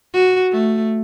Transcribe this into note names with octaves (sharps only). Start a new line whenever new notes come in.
F#4
A3